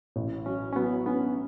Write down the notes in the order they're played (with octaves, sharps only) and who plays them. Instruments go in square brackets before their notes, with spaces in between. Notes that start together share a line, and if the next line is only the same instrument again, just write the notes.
[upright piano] A1
[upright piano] F#3 [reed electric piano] C#4
[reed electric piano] C#4
[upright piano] F#3 [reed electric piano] B3
[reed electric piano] B3 [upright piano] C#4